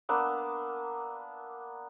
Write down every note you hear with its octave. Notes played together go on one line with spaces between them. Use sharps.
A#3 B3 D4 E6